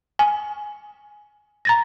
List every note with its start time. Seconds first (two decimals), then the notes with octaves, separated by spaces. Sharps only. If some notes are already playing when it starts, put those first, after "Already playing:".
0.19 G#5
1.65 A#5 A6 A#6